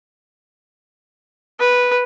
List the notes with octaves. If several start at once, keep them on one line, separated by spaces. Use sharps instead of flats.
B4